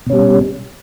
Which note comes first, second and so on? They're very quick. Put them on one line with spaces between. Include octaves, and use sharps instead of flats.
B2 C#4 G3